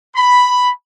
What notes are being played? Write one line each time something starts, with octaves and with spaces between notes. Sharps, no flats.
B5